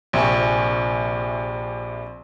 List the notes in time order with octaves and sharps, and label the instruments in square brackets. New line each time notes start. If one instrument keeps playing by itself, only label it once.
[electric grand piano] A#1 C3 E5 G#5 C#6